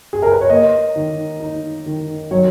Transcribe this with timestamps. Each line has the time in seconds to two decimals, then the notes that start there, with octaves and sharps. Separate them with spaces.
0.13 G#4
0.22 A#4
0.32 B4
0.41 C#5
0.50 A#3 D#5
0.96 D#3
1.40 D#4
1.86 D#3
2.31 F#3 C#5